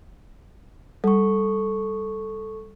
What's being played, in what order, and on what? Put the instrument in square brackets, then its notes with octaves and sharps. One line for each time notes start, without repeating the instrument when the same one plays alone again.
[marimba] G3 [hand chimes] A4 C#6